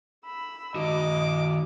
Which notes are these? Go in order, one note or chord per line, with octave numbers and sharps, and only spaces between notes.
B5 E6
D#3 F#4 D#5 D6